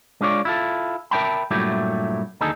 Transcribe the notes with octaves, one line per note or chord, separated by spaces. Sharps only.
G#3 D4 F4 C#5 D5
E4 F4 A4
A#4 C5 E5 G5 A5 B5
G2 A#2 F#3 A3 E4 G4
D#2 D3 D#4 G#4 A4